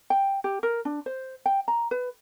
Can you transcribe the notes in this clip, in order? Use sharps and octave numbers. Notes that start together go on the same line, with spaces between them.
G5
G4
A#4
D4
C5
G5
A#5
B4